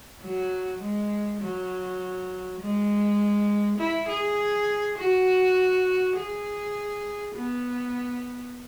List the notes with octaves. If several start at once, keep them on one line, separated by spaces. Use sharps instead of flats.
F#3
G#3
F#3
G#3
E4
G#4
F#4
G#4
B3